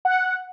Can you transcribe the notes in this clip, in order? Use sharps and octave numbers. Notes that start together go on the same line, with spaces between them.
F#5